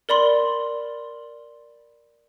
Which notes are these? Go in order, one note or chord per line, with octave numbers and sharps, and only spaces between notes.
A#4 D5 B5 C6